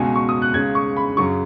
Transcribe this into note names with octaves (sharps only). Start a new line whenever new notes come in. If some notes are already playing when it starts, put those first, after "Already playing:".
Already playing: C#2 B2 G#5
C#6
D#6
F#6
C#2 C#3 G#6
C#6
B5
F#2 C#3 C#6